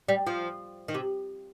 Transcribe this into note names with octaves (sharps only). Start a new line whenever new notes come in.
G3
F3
D#3
C3